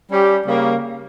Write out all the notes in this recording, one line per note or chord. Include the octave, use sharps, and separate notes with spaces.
G3 C#4 G4
C#3 G3 A#3